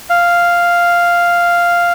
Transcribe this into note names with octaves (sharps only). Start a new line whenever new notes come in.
F5